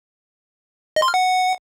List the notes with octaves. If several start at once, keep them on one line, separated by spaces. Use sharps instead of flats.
D#5
C6
F6
F#5